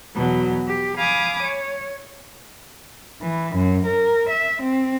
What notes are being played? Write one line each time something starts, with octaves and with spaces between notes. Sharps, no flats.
E2 B2 F#3
G4
F5 G#5 B5 D6 D#6
C#5
E3
F#2
A#4
E5
C4